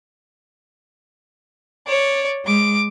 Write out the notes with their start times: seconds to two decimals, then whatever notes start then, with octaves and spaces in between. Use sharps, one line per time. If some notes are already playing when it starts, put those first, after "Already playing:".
1.87 C#5 D5
2.44 G#3 D6